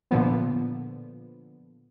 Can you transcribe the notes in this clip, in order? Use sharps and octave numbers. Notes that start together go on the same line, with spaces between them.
A#2 D3 F3 B3